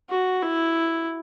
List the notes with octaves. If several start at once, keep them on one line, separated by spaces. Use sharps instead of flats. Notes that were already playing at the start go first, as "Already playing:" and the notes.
F#4
E4